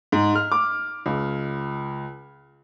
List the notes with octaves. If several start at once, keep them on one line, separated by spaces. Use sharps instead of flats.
G#2
F6
D6
C#2